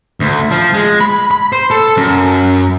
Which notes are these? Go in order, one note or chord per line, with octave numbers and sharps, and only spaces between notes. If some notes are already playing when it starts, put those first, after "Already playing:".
D2
F3
G#3
B5
B5
C5
A4
F#2